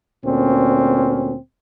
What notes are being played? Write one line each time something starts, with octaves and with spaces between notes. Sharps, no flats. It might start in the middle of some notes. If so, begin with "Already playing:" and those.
D2 A#2 C4 C#4